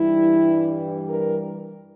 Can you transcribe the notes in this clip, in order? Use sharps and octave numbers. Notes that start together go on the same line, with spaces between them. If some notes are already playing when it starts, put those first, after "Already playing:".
Already playing: G2 E3 G3 E4
A#4